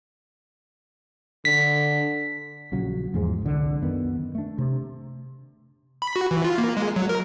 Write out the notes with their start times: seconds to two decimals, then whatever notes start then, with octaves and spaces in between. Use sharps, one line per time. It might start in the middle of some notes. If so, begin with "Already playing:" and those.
1.45 D3 B6
2.72 A#1 C#3 F#3
3.14 E2 G#2 F3 G#3
3.42 C2 D3
3.82 F#2 D#3 B3
4.35 A3 D4
4.58 C3
6.02 B5
6.16 F#4
6.31 E3
6.44 F4
6.58 A#3
6.77 G#3
6.96 F#3
7.09 A#4